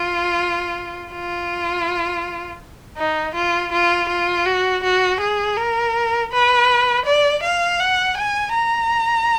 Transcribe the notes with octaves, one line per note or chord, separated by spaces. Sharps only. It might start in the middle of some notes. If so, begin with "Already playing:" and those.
Already playing: F4
F4
D#4
F4
F4
F4
F#4
F#4
G#4
A#4
B4
D5
F5
F#5
G#5
A#5